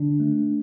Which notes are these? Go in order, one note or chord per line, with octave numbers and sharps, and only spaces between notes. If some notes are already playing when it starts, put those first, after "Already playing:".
Already playing: D3 D4
A3